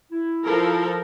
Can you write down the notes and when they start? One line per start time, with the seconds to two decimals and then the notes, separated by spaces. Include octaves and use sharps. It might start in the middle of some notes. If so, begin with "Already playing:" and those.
0.12 E4
0.45 F3 A4 A#4